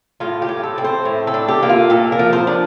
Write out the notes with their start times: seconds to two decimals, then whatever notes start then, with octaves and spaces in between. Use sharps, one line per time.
0.20 A2 F4
0.42 G4
0.49 A2
0.64 A4
0.78 C4
0.84 C5
1.05 A2
1.27 A4
1.34 D4
1.48 G4
1.63 A#3
1.69 F4
1.90 A#2 A4
2.12 A#4
2.19 F3
2.33 C5
2.47 D4